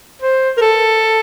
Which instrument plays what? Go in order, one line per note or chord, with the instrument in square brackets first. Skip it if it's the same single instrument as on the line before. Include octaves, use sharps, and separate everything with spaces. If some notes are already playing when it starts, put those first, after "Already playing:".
[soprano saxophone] C5
A#4
A4